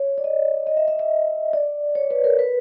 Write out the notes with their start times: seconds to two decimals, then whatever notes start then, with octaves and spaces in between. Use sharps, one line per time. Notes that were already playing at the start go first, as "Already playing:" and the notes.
Already playing: C#5
0.18 D5
0.24 D#5
0.67 D#5
0.77 E5
0.88 E5
0.99 E5
1.53 D5
1.95 C#5
2.11 B4
2.24 A#4
2.39 B4